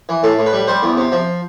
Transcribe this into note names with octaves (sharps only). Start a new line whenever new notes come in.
E3
A2 A4
A2
B4
G3
G3 C5
E2
C3
F3